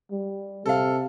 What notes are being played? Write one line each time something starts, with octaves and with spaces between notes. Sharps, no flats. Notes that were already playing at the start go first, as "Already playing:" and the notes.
G3
C3 A4 F5